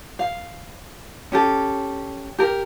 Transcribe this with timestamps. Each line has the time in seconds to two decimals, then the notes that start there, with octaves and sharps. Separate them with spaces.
0.19 F5
1.32 C#4 G4 A4
2.39 G4 A#4